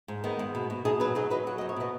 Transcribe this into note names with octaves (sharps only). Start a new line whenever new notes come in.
G#2
D#3 B3 D#4
G#2
B2
B2
B2 D#4 G#4
F#3 F#4 B4
F#3 D#4 G#4
F#3 B4 D#5
F#3 F#5
F#2 D#5
C#5
B2 B4 D#5